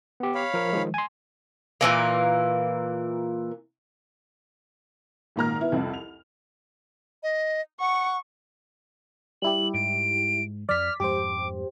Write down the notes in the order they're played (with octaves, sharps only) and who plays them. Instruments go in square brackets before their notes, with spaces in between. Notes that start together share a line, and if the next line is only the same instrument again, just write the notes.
[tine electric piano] B3 G4
[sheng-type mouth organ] C#5 F5 B5
[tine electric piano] F3 A#4
D#3 F3 G#3
G#5 C6
[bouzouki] A#2 E3 A#3
[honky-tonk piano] G#1 A#2 A#5 F6
B3 E4
C2 F2
F7
[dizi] D#5
[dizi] F#5 [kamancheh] C#6
[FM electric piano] G3 E4 G4 [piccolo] F#7
[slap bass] G#2 G#3 [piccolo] D7
[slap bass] F2 F3 [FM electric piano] D5 B6 [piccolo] F6
[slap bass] F2 G#2 G#3 [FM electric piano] G4 C5 [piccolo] D6